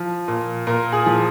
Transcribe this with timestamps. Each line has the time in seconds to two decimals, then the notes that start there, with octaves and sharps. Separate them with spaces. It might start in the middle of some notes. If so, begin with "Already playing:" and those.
Already playing: F3
0.28 A#2
0.67 A#2 A#4
0.93 G#4
1.06 F3